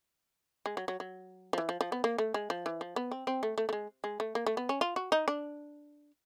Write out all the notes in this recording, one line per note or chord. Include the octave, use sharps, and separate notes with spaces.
G#3
F#3
F#3
F#3
F3
E3
F3
F3
B3
A#3
A3
G#3
F3
E3
F3
B3
C4
C4
A3
A3
A3
G#3
G#3
A3
A#3
A3
B3
C#4
F4
F#4
D#4
D4